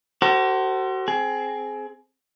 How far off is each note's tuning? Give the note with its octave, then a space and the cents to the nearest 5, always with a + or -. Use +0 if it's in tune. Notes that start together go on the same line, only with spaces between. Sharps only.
F#4 +35 A4 +40 C5 +5
C4 +0 G#4 +20